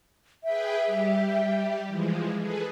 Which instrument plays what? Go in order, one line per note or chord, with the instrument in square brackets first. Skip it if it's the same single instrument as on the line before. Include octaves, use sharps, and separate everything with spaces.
[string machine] G#4 B4 G5 [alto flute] E5
[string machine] G3 G4
E3 F3 G#3
G#4 A4 B4